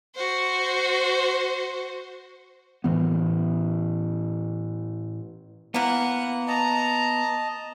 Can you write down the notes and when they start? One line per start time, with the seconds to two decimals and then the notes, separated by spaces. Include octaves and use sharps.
0.15 F#4 C5
2.84 A2 E3 B3
5.74 E3 A#3 B3 F#5
6.47 D#5 A5 A#5